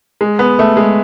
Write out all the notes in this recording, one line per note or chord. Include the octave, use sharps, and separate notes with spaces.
G#3
B3
A3
G#3